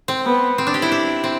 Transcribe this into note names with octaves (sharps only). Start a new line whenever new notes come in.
C4
B3
C4
D4
G4
E4
D4
C4